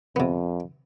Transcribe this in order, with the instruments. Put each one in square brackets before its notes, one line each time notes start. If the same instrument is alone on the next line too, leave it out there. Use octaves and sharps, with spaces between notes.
[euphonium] F2 [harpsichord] C3 B3